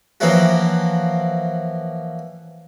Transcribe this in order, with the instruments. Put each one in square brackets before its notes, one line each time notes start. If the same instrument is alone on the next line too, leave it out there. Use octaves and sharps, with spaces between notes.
[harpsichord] E3 F3 A#3 C#4 E4 F#4